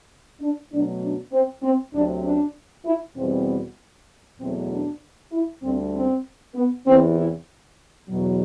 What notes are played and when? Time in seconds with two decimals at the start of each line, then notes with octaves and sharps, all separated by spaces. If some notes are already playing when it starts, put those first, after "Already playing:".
0.40 D4
0.70 B2 F#3 A3 D4
1.02 D4
1.33 C4
1.62 C4
1.93 D2 C3 F#3 D4
2.24 D4
2.85 E4
3.16 E2 B2 G3 C4
4.40 E2 B2 F#3 A3 C4
4.71 D4
5.32 E4
5.63 D2 D3 G3 C4
5.94 C4
6.55 B3
6.86 E2 C3 E3 C4
7.17 E4
8.09 E2 B2 F#3